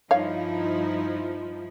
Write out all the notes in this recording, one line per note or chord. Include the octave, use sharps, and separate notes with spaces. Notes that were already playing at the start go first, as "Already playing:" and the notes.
G2 F3 D#4 E4 C#5 F5